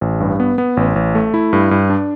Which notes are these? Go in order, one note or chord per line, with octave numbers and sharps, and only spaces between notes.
A1
G2
B3
B3
A1
A1
A3
E4
G2
G2
D4